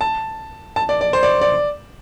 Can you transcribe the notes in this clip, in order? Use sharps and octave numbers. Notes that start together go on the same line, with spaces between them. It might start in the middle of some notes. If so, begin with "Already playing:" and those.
A5
A5
D5
D5
C5
D5
D5